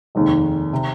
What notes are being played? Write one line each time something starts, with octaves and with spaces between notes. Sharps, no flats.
F1 D#2 D#3 G#3
C3